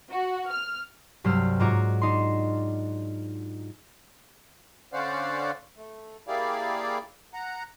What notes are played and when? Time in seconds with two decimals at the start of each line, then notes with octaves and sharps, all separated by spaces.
0.10 F#4
0.52 F6
1.24 C2 G2 F#3 C5 E6 F6
1.59 G#2 F4 F#4 C#5 A#5 D6
2.01 D4 D#4 C6
4.93 D3 C#4 C5 D5 F5 F#5
5.77 A3
6.28 A#3 E4 G4 G#4 D5 F5
7.34 F#5 A#5